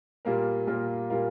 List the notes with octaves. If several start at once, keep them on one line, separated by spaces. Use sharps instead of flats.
A#2 G3 A#3 F4 A#4
A#2 G3 A#3 F4 A#4
A#2 G3 A#3 F4 A#4